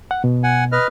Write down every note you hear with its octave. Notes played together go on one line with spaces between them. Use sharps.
F#5
B2
F#5 G#5
B4 D#5 F6